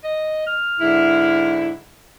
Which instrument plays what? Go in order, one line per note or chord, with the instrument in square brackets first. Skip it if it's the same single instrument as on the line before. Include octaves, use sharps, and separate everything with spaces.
[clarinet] D#5
F6
[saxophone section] G#2 D3 E4